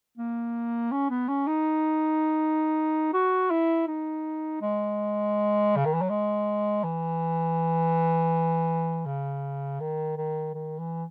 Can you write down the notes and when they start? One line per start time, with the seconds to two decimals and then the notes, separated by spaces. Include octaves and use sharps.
0.18 A#3
0.91 C#4
1.10 B3
1.28 C#4
1.47 D#4
3.13 F#4
3.50 E4
3.87 D#4
4.61 G#3
5.77 C#3
5.85 D#3
5.93 E3
6.01 F#3
6.10 G#3
6.84 E3
9.06 C#3
9.80 D#3
10.17 D#3
10.54 D#3
10.79 E3